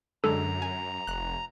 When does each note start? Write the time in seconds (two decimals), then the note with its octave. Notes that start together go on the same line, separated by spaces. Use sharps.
0.24 F#2 D3 G#3 D4 A4 A#5
0.62 G#5
1.07 F1 F#6